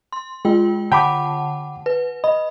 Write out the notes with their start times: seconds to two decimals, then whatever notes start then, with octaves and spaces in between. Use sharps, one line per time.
0.13 C6
0.45 G#3 F4 G5
0.92 D3 F#5 G5 A5 B5 D6
1.86 B4
2.24 D#5 B5